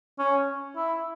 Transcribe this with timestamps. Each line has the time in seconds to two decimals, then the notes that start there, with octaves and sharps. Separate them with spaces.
0.19 C#4
0.76 E4